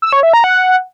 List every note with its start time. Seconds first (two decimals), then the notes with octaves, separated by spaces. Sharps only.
0.02 E6
0.13 C#5
0.23 E5
0.33 A#5
0.44 F#5